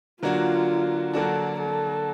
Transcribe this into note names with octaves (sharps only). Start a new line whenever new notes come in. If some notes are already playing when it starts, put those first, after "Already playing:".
D3 F#3 A#3 D4 F4 F#4
D3 F#3 A#3 D4 F#4 A4
A4